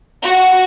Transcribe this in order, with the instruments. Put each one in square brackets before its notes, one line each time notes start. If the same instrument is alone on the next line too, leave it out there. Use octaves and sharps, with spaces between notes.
[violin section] F#4